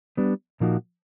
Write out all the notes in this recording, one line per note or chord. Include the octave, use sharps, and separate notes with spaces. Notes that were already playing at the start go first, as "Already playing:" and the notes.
G3 B3 D4
A#2 F3 A#3 D#4 F#4